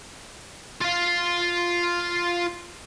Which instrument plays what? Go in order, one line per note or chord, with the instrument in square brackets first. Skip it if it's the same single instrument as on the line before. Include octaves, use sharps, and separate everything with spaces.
[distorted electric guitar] F4 F5